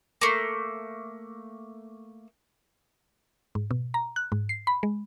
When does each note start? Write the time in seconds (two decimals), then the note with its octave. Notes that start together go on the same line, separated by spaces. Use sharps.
0.21 A3 A#3
3.55 G#2
3.71 B2
3.94 A#5
4.16 F#6
4.32 G#2
4.49 C7
4.67 B5
4.83 G#3